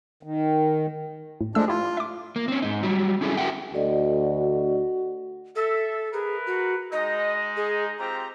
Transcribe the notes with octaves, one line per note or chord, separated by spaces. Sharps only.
D#3
A2
F3 G#3 A3 D4 E6
E4 F4 G4
E5 D6
A#3
C4 C#4
G#2 D#4
F#3 G3
C4 C#4 E4 G#4 A4
F#4 G4 A#4 E5 F#5 G5
D2 F#4 A4 D5 D#5
A4 E5
G#4 A#4 B4
F#4
G#3 D#4 D#5
G#4
C4 F4 G4 A#5